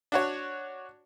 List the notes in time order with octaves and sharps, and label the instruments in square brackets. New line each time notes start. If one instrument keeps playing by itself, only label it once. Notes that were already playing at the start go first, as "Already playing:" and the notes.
[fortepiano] D4 F#4 C#5